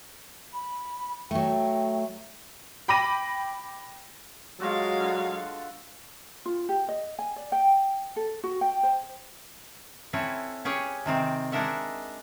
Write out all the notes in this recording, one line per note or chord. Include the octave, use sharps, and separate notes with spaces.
B5
F#3 A3 G5
G5 B5 D6 A#6 D#7
F#3 G#3 F4 F#4 A4 F5
D3 A4
F4
G4
D#5
G#5
D5
G5
A4
F#4
G5
C5
C4 C#4 E4 A4 B4 C#5
C#4 G4 G#4 B4 C#5
C3 D#3 C4
G#3 D4 D#4 A#4 E5 F#5